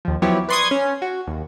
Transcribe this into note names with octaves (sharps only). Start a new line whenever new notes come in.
D#2 F3
F3 F#3 B3 E4 G4 C#5
B4 D5 C6 C#6 D#6 G#6
C#4
F#4
D#2